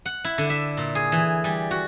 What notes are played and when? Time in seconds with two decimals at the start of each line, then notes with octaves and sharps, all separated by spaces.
0.06 F#5
0.24 E4
0.38 D3
0.50 E5
0.77 A#2
0.95 G#4
1.12 E3
1.44 G3
1.71 F#4